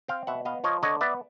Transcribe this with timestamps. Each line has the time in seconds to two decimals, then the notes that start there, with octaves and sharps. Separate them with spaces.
0.08 C4 F5 G5
0.27 B2 E5 F#5
0.45 B3 D#5 F5
0.64 F3 C#5 D#5
0.83 D3 C#5 D#5
1.01 B3 D5 E5